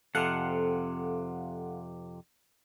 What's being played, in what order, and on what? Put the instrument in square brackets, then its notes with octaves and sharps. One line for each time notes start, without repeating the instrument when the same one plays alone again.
[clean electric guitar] F2 C3 [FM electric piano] A4 F5 F#5